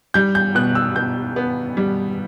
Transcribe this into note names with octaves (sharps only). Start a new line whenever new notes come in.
G3 G6
G6
B2 F#6
E6
B2 G6
B3
G3